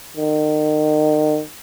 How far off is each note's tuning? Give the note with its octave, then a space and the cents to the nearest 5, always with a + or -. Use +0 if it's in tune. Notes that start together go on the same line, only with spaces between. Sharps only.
D#3 -35